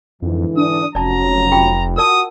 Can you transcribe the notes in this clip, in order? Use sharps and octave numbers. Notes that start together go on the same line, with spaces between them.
F2 G#2 D3 E3
D4 D#6
F1 F#3 C#4 D5 A5 A#5
F4 G4 G5
F#4 A#4 D5 A5 D#6